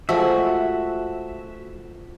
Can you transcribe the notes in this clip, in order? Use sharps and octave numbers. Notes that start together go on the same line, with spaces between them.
F3 G#3 A3 F#4 E5